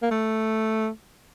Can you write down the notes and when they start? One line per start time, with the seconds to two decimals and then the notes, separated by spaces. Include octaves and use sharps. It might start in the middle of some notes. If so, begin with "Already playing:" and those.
0.02 A#3
0.11 A3